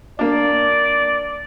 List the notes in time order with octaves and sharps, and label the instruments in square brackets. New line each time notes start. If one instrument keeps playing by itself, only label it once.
[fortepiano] A#3 D4 [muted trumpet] D5